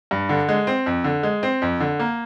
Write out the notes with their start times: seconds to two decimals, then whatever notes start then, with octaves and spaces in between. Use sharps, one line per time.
0.11 G2
0.29 D3
0.49 G#3
0.67 C4
0.86 F2
1.04 D3
1.23 G#3
1.43 C4
1.62 F2
1.80 D3
1.99 A#3